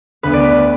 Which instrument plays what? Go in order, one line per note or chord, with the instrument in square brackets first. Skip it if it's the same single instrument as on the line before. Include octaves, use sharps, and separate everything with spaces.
[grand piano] D2 D3 B3 [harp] B4
[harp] D5
B4